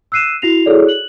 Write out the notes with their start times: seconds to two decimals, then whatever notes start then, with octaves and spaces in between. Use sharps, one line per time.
0.12 E6 F#6 C7 D#7 E7
0.42 E4 F#4 A#6 C7 F7
0.66 E4 F#4 G#4 A4 C#5 D5
0.86 F#6 F#7